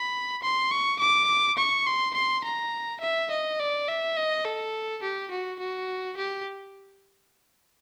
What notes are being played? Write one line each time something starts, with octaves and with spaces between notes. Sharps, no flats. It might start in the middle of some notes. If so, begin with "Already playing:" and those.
Already playing: B5
C6
C#6
D6
C#6
C6
C6
A#5
E5
D#5
D5
E5
D#5
A4
G4
F#4
F#4
G4